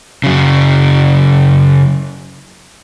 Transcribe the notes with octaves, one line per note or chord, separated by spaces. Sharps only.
C#3 F#3